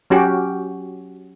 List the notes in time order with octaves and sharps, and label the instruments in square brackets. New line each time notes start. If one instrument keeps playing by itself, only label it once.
[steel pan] F#3 C#4 F#4 G4